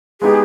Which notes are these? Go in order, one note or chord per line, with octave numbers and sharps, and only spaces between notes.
G#3 B3 D#4 G4 G#4